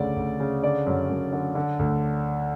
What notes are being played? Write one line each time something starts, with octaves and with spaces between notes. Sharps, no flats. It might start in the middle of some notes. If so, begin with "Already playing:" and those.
Already playing: D2 C#3 D5
D2
C#3
D3 D5
F#2
F#2
D3
D3
D2